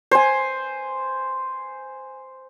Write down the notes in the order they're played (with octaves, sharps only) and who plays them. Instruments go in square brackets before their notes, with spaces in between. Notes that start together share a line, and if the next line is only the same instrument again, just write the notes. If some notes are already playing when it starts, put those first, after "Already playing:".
[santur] C5 G#5